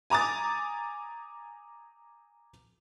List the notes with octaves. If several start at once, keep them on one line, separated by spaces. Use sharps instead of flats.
G#5 A#5 D6 D#6 A6